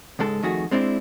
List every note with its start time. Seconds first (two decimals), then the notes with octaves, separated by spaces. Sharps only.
0.19 C#2 G#2 G#3 A4
0.43 F2 D#3 A3 F#4 G#4
0.71 G#3 C4 D4 E4